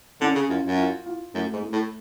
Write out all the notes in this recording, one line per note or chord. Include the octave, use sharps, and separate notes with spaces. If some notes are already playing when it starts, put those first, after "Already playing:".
D3 C#4
C#3
F#2 F4
F#2
F4
F4
F#2 A3
G#2
A3
A2